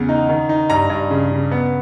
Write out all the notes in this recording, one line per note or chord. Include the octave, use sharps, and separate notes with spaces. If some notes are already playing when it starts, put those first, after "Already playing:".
Already playing: E2 C#3
D#4
D#3
D#4
G2 A#5
G2
C#3
C#3
B3